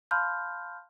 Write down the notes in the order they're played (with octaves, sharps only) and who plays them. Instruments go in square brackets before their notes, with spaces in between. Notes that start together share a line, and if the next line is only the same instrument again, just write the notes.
[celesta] F5 A5 B5 C6 F6 G6